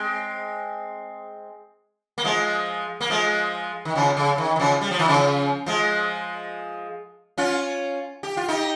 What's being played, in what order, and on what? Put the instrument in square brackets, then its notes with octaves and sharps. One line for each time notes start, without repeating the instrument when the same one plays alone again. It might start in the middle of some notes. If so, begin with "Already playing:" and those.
Already playing: [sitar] G#3 C4
A#3
F3 G#3
A#3
F3 G#3
D#3
C#3 F3
C#3
D#3
D#3
C#3 F3
G3
F3
D#3
C#3 F3
F3 G#3
C#4 F4
G4
F4
D#4 G4